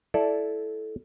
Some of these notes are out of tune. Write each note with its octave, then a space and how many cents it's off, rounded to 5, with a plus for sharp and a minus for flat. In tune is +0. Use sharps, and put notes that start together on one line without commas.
E4 +0 A4 -10 D5 -5